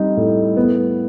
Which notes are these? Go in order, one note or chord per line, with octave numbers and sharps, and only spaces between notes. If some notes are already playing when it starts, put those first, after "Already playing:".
Already playing: G3 C4 D#4
A2
B3